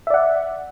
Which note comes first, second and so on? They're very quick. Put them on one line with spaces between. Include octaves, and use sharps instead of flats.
E5 D5 F#5